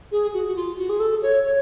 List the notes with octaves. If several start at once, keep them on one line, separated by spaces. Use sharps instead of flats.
G#4
F#4
F#4
F4
F#4
G#4
A4
C#5
C#5